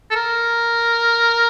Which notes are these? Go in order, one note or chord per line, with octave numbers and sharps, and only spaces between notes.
A4
A#4